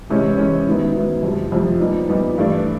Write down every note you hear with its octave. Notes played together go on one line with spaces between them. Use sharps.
E2 C3 E3 G#3 C#4
E2 C3 E3 G#3 C#4
G#2 D#3 F#3 B3 E4
G#2 D#3 F#3 B3 E4
F2 C3 F3
F2 C3 F3
A#2 G3 B3 D#4
A#2 G3 B3 D#4
G2 E3 A3 D4